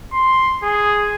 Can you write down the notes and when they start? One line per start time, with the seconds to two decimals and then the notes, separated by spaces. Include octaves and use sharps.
0.13 C6
0.63 G#4